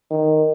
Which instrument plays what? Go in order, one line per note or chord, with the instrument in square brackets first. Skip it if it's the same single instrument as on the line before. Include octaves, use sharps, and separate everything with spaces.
[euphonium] D#3